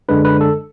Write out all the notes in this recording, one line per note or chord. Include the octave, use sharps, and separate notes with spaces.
F#2 D3 G#3 D4 B4
B4
A4